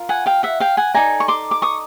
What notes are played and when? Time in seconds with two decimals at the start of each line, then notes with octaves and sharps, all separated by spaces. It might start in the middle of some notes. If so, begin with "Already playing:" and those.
Already playing: F4 A#4
0.09 F#5 G#5
0.26 F5 G5
0.43 E5 F#5
0.60 F5 G5
0.77 F#5 G#5
0.94 D#4 F#4 A4 D5 G#5 A#5
1.20 C#6
1.28 C6 D6
1.51 D6
1.62 C#6 D#6